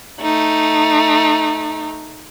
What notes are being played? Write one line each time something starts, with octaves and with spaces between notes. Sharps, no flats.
A3 D#4